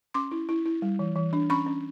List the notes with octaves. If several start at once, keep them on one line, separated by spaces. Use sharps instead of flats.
C#4 C6 D6
E4
E4
E4
G3
E3
E3
D4
C#4 B5 C#6
C#4